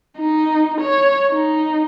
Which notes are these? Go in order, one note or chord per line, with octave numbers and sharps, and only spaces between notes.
D#4
C#5
D#4